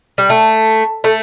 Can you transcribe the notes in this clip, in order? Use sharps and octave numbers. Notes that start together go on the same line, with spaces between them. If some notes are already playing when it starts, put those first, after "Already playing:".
G3
A3
A3